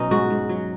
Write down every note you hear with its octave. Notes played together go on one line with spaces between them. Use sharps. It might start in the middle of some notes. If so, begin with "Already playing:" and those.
Already playing: B2 F#3 B3 C#4 D#4
G#2 F#4
G#2
F#3